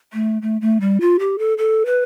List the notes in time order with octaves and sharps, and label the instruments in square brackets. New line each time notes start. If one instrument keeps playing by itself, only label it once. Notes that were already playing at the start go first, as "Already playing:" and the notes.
[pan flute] A3
A3
A3
G3
F4
G4
A4
A4
B4